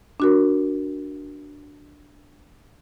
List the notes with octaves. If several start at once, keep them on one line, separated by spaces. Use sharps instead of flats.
D4 F#4 A#4